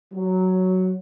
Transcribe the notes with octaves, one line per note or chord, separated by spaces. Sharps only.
F#3